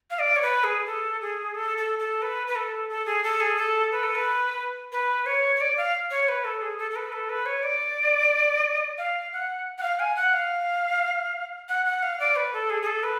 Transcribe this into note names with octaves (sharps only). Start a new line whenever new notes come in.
F5
D5
C#5
B4
G#4
A4
G#4
A4
A4
A4
B4
B4
A4
A4
G#4
A4
G#4
A4
B4
A4
B4
B4
C#5
C#5
D5
F5
C#5
B4
A4
G#4
A4
A4
B4
A4
B4
C#5
D5
F5
F#5
F#5
F5
G#5
F#5
F5
F#5
F#5
F5
D5
B4
A4
G#4
G#4
A4
B4